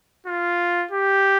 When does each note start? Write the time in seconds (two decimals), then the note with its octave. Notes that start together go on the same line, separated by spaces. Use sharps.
0.27 F4
0.91 G4